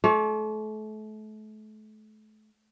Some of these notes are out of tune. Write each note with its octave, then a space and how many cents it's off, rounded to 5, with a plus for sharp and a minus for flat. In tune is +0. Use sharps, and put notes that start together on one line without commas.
A3 -35 C#5 +45